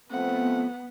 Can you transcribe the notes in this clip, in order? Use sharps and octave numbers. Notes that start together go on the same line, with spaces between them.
F3 A3 B3 C4 F#5